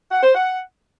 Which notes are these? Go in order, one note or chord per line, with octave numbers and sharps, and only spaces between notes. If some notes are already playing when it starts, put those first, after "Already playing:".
F#5
C5
F#5